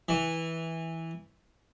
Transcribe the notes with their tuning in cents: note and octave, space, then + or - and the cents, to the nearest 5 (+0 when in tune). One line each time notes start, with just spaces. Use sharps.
E3 -10